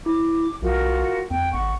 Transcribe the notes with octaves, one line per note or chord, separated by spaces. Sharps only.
E4 D6
B1 F4 F#4 A#4
F2 G5
G#1 F#5 C#6